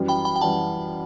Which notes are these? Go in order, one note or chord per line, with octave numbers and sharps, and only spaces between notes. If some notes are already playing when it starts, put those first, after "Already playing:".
Already playing: F#2 E3 G3
G5 B5
G5 B5
G5
F#2 E3 G3 F#5 A5